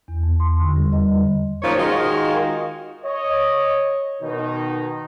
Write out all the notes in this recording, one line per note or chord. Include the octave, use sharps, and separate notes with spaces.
E2
F2
C6
D3
G3
D#5
F#2 A#2 F3 D#4 C#5
D#3 G#3 D#4 F4 F#4 A#4
C#5 D#5
B2 D#3 D#4